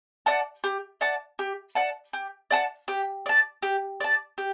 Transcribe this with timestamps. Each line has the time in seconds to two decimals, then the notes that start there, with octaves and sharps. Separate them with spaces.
0.26 D5 F#5 A5
0.64 G4
1.01 D5 F#5 A5
1.39 G4
1.75 D5 F#5 A5
2.13 G4
2.51 D5 F#5 A5
2.88 G4
3.26 D5 A5
3.62 G4
4.00 D5 A5
4.38 G4